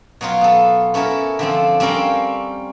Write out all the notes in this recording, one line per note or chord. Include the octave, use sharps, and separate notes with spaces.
B2 F#3 F4
B3 A4
B3 C#4 E4 A4 A#4
D3 F3 C4
G3 C4 C#4 A#4 F5 G5